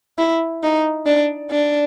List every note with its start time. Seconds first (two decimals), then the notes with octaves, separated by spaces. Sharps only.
0.18 E4
0.63 D#4
1.06 D4
1.51 D4